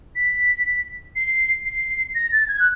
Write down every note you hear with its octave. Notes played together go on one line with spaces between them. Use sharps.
B6
C7
C7
A#6
A6
G#6
F#6